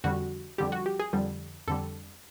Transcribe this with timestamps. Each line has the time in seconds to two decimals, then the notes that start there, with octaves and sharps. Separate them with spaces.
0.04 F2 D3 G3 F#4
0.58 F2 D3 G3 G4
0.72 F#4
0.86 G4
0.99 G#4
1.13 F2 D3 G3
1.68 F2 D3 G3 A4